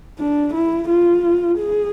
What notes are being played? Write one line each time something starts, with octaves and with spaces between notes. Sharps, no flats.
D4
E4
F4
G#4